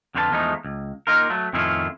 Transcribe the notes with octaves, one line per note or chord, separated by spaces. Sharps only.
F2 D3 F4 F#4 B4 A5
E2 F3 G#3 A3 D#4
C#2
A#3 D#4 F4 A#4
F#3 A3
F2 A2 D#3 C#4 E4 F4